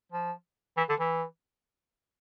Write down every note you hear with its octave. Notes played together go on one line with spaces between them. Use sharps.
F3
E3
D3
E3